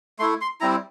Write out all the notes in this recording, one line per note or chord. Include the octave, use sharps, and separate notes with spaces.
A3 E4 C6
C6
G3 C4 E4 A#5